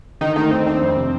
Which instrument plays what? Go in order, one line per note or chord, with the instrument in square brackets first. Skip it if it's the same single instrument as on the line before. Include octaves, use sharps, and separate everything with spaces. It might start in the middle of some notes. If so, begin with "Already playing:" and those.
[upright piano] D3 [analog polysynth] D#3 D#4
[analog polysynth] D#3 D#4 [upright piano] A3
[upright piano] D#2 [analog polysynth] C4
[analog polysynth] C4 [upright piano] D4
[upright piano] F2
C3